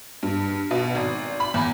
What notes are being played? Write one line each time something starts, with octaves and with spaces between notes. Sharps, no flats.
G2
B2
G#1
B5
E2